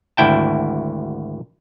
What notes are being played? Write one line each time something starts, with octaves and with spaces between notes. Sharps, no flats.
G#1 D2 E4 G5 A5